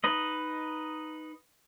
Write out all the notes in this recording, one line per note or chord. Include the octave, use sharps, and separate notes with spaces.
D#4 B4 D#5